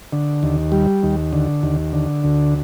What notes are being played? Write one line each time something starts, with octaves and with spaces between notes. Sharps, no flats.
D3
D#2
G3
D#2
D3
D#2
D3
D2